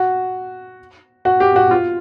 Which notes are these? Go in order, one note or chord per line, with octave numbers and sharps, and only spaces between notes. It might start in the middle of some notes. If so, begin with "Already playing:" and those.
Already playing: F#4
F#4
G4
F#4
F4